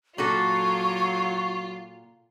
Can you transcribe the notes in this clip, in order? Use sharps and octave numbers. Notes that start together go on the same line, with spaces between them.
A#2 F#3 F4 F#4 A4 C#6